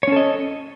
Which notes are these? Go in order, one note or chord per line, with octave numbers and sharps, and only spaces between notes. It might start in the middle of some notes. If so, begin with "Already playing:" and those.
C#4 A4 C#5 D#5